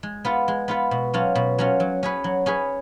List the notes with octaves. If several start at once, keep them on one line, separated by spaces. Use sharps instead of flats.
G#3
B3 F4 B4
G#3
B3 F4 B4
B2
F#3 C#4 F4
B2
F#3 C#4 F4
F#3
C#4 G#4 B4
F#3
C#4 G#4 B4